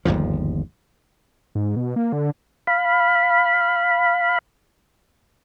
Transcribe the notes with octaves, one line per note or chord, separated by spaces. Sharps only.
G1 D#2 G#2 F3
G#2
B2
A#3
D3
F5 B5